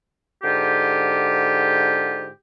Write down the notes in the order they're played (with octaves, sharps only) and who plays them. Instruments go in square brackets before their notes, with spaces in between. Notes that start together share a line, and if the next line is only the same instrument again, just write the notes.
[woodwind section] G#2 D3 F4 G4